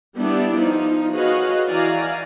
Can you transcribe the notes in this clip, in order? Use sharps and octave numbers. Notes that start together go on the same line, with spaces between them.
G3 B3 D4 E4 G4 D5
F3 D#4
F#4 G#4 B4 C#5 D#5 F5
E3 F#4 D5 F5 G#5 A#5